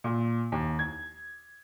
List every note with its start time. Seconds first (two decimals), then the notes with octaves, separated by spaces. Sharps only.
0.04 A#2
0.52 D#2
0.79 G#6